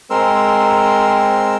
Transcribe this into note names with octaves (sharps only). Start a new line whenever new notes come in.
G#3 C4 A#4 C6 E6